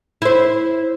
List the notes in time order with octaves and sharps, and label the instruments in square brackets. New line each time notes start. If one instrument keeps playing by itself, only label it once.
[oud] E4 C5